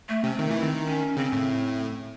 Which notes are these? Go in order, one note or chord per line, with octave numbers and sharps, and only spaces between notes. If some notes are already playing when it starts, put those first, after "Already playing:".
A3
C3 C#4
D#3 C4
E3 A3
D#3 C4
D#4
C#4
C#3 C4
A2